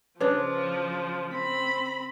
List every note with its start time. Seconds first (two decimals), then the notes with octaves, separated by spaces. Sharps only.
0.21 C#3 F3 D4 B4
1.34 C4 B5